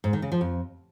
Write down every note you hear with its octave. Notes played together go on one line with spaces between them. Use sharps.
G#2
D#3
C#3
F3
F2